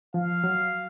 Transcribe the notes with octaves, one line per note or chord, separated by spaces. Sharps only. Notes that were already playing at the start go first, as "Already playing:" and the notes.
F3 F5
F#3